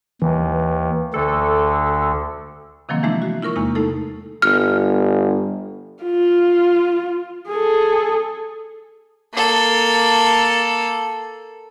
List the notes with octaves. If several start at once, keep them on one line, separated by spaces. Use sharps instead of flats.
D#2 E3
D2 D3 A4
C3 D#3 F3 F#3 A#3 C4
E3 F3 G#3 A3 D4 E4
F#4
E4 F4 A#4 C#6
E2 C3 G#3 A#3 D#4
A3 D#4 E4 A4
G1 F6
F4
G#4 A4
A#3 A4